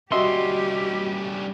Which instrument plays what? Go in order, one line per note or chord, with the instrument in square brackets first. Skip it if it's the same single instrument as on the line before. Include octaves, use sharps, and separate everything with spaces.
[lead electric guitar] G3 C#4 [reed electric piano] F#4 D#5 E5 [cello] G4 [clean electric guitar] C6